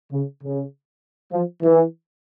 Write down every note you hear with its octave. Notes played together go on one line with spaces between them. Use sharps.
C#3
C#3
F3
E3